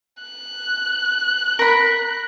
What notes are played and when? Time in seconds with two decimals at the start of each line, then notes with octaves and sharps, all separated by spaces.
0.23 F#6
1.59 A#4 B5